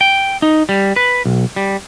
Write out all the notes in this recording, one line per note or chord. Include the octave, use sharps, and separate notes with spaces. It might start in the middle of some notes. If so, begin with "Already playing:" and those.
G5
D#4
G3
B4
B1
G3